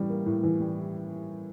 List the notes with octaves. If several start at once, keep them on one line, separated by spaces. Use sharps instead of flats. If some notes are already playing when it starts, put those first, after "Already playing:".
Already playing: A2 E3 G3
A#3
A2
E3
G3